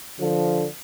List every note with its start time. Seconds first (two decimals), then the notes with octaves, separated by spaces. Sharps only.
0.19 D3 F3